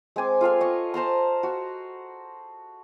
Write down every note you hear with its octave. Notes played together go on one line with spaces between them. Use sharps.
G#3 C4 G#5 D6
F4 A4 F5 G#5
D#5 C#6
C5 A5 A#5 C6
F#4